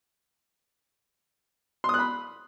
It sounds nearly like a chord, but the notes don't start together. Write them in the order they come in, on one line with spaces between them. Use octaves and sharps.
C6 D#6 F#6 B5